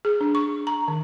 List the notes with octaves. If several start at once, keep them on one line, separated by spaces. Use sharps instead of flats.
G#4
D4
C#6
A#5
D#3